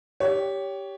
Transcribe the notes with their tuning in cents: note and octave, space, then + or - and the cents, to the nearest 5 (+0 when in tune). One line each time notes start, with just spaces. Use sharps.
G4 +0 C#5 +20